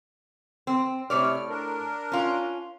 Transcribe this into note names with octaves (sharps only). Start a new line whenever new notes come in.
C4
A2 C3 C#5 D5 F6
D4 A#4
C#4 F4